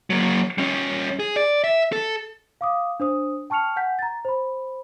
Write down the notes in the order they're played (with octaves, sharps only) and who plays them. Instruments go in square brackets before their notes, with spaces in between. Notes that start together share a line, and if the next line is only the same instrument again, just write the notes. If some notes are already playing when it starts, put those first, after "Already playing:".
[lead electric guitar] F#3 A#3
G3 C#4
G#4
D5
E5
A4
[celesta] F5 D6 D#6
D4 C5 D#6
G5 A5 C#6 F6 C#7 F7
F#5 G#5 G6 B6
A#5 A6
C5 B5